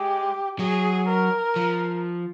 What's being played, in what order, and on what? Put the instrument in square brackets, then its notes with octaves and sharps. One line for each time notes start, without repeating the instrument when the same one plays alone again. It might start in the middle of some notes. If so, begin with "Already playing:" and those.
Already playing: [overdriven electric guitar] G#3 [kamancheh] G4
[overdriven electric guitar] F#3 [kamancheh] G#4
[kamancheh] A#4
[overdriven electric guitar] F3